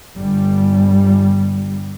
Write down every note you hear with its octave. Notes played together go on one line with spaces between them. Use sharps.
G1 G3